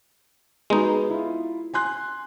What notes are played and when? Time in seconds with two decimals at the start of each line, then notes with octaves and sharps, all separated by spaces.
0.70 G#3 B3 D#4 F#4 G#4
1.10 E4 F4
1.74 G#5 C6 F#6